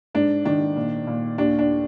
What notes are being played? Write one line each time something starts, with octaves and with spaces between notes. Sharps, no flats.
G#2 D4
D#3 D4
A#2
A#2
D#2 D4
D4